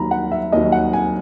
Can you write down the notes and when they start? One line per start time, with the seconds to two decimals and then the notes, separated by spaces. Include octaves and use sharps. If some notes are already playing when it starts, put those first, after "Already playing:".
Already playing: D#2 D#3 F#3 A#5 B5
0.11 F#5
0.31 E5
0.52 D#2 D#3 F#3 D#5
0.72 F#5
0.93 G#5